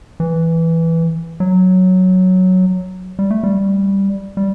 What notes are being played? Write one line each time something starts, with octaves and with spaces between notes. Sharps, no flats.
E3
F#3
G3
A3
G3
G3